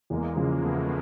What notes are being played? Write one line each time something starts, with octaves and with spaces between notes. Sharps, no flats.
E2 G#3 A#3
C#3 F3
E2 A3 B3